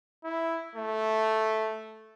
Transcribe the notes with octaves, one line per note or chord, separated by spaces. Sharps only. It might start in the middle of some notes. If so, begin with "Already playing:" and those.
E4
A3